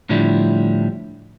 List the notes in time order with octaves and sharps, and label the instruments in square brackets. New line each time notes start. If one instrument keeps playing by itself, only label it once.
[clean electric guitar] A2 D3 F3 G3 E4